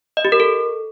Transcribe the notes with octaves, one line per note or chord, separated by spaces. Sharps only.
D#5
G4
A#4
A4